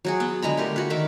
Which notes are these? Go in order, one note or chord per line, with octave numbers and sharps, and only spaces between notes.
F#3 F#4 G#4
B3
D3 G#3 A#5 B5
A3 G4 A#4
F#4 B4
D#3 A#4 E5 D6